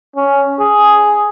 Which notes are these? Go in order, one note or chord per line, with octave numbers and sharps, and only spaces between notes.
C#4
G#4